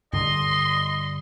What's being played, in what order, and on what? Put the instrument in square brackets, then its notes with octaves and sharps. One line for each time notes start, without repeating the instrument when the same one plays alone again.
[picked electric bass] G2 D3 G3 [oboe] D#5 [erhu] C6